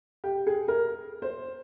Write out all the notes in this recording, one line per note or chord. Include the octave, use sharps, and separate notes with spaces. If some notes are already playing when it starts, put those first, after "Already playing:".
G4
G#4
A#4
C5